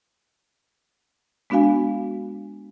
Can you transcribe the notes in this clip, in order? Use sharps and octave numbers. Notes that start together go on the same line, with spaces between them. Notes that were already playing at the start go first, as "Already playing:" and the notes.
G#3 B3 D4 F#4 F5 G#5